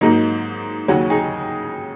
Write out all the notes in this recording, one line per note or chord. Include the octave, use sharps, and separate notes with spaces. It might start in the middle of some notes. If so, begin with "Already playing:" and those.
G#2 F#3 A#3 D#4
D#2 C#3 F#3 C#4 F#4
D#4 G#4